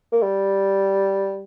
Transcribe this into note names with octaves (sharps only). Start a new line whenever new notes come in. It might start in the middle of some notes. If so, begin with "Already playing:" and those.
A#3
G3